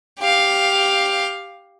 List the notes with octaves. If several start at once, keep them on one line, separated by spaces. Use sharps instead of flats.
G4 F5